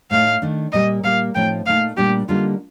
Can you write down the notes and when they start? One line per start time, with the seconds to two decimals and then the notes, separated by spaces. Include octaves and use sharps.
0.11 A2 A3 D#4 F5
0.42 D#3 A3 D4
0.72 A#2 G3 A#3 D#5
1.03 A#2 G3 A#3 F5
1.35 A2 F3 A3 C4 D#4 G5
1.66 A#2 A3 D#4 F5
1.97 A#2 G3 D4 G4
2.28 D3 G3 A#3 D#4 F4